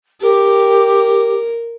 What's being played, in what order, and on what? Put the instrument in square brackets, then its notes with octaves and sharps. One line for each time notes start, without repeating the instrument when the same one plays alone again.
[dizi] G4 [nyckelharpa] A#4